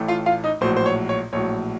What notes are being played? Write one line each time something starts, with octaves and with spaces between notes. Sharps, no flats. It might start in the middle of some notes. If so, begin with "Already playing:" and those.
Already playing: A1 A2 A3
F4 F5
F4 F5
D#4 D#5
A#1 A2 F#3 C5
C5
C#5
C#5
A#1 A2 F#3 C#5